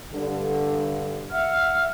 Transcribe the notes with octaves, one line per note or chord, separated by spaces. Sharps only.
G2 D3
E5 F#5 F6